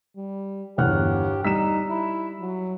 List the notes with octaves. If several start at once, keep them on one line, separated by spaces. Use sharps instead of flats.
G3
G1 E2 G4 F#5 F6 F#6
G3 D#4 E6 B6 E7
E4
F#3